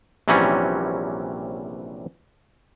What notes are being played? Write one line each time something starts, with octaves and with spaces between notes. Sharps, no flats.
A#1 C3 E3 F#3 G3 C#4